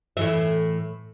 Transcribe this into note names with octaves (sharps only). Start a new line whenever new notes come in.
A2 E3 E5